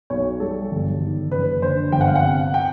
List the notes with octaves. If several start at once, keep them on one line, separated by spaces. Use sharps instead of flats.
B1 C#5
G3 A4
G1
D#3
F#1 B4
D3 C5
G1 G5
F#5
F5
F#5
C3
G5